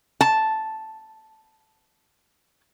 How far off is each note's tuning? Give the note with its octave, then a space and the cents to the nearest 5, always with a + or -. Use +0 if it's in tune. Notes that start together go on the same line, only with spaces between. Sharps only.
A5 -5